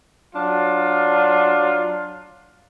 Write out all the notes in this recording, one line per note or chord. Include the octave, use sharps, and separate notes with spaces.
F#3 D4 F4